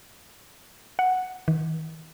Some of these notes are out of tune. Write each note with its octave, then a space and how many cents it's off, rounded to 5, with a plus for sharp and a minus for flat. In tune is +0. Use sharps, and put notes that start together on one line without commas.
F#5 +0
D#3 +40